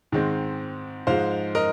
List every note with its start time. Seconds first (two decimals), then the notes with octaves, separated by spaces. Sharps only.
0.12 G#2 D#3 G#3 C4
1.07 G#2 F3 G#3 C5 F5
1.55 A#4 D#5